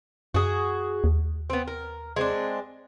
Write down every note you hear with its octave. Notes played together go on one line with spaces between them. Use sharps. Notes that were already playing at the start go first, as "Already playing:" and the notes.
F#2 F#4 G#4
D#2
B3 C4
A#4
G#3 C4 D4